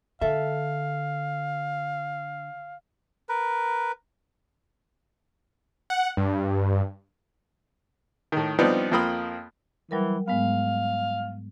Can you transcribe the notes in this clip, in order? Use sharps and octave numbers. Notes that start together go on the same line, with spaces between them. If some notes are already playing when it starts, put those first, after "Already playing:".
D3 A4 E5 F5
A#4 B4
F#5
G2
A2 D#3
F3 G3 B3 C4 D4 D#4
F2 F3 A#3 G5 B5 D#6
E3 F#3 G3 A#4
G#2 G#3 B3 F5